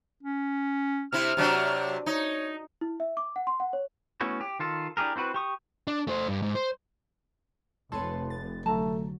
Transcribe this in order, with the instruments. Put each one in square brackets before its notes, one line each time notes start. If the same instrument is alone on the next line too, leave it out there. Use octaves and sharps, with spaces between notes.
[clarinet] C#4
[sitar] C3 C4 E4 [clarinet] F6
[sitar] C3 F#3 D4
[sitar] D#4 [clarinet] C#5
[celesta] E4
E5
D6
F#5
C6
F#5
C#5
[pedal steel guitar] A3 B3 C#4 E4 F#4
G4
D#3 F4 A4
D4 E4 G4 G#4 A#4
C4 E4 F#4 B4
G4 C#6 D#6
[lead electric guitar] D4
A3 C5
G2
G#2
C5
[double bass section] F1 [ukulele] A4 C#5 [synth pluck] B4 A5 C6
[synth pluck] A6
[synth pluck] D3 F#3 [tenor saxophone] A3 [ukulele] A5 A#5